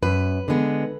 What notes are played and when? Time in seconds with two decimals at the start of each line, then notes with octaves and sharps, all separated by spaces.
0.02 F#2 B4
0.48 D3 G#3 B3